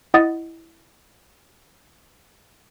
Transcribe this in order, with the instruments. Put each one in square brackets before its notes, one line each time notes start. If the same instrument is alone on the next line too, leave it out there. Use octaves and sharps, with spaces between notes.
[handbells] E4 D#5 F#5 D#6 A6